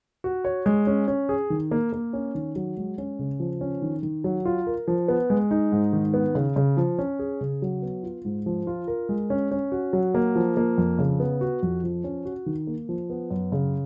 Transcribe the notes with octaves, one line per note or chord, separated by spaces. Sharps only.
F#4
C#5
G#3
C#4
C#4
G#4
D#3
A#3
A#3
C#4
D#3
F#3
G#3
C#4
C#3
F3
C#4
D#3
D#3
F#3
F4
A#4
F3
B3
G#3
D#4
G#2
D#3
B3
C#3
C#3
F3
C#4
G#4
C#3
F#3
B3
F4
G#2
F3
F4
A#4
G#3
C#4
C#4
F#4
F#3
A#3
F3
A#3
F2
C#3
B3
F#4
F2
F3
C#4
F#4
D#3
A#3
F3
B3
F#2
C#3